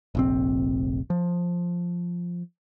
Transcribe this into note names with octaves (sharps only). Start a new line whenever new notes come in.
F1 A#1 C4
F3